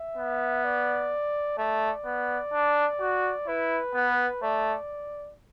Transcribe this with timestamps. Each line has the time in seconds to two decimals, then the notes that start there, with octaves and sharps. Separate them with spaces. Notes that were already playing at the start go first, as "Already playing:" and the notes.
Already playing: E5
0.17 B3
0.64 D5
1.58 A3 D5
2.05 B3
2.53 D4
3.00 F#4
3.47 E4 B4
3.94 B3
4.43 A3 D5